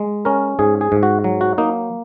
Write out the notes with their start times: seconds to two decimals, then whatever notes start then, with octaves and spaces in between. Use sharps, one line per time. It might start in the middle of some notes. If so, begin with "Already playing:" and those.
Already playing: G#3
0.25 C#4 A#4
0.59 G#2 G#4
0.81 G#4
0.92 G#2
1.03 F#4
1.24 F#3
1.41 F#4
1.58 A#3 D#4